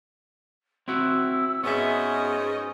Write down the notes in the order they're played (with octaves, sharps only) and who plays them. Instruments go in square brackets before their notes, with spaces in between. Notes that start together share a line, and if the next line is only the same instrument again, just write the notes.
[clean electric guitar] C4 E4 F#4 [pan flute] E6
[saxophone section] G#2 C#4 D#5 [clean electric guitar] B3 E5 [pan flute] F#4 [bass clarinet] G#4